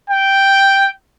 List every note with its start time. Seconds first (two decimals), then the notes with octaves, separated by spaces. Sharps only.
0.10 G5